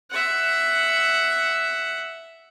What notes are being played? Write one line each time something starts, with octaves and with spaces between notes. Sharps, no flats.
E5 F#5